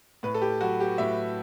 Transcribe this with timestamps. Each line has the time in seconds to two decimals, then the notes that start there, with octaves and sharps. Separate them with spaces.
0.23 A2 B4
0.35 A4
0.42 G4
0.61 F#3 F#4
0.80 G4
0.98 A2 E5